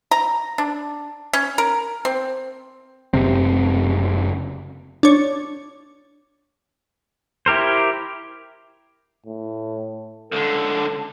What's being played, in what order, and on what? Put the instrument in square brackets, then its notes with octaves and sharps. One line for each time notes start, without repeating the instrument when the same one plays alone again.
[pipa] A#5
D4
C#4
A#4
C4
[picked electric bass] F#1 C3 C4
[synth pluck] D4 C#5
[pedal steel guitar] E4 G4 A#4 C5
[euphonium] A2
[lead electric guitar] C#2 D3 [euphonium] A4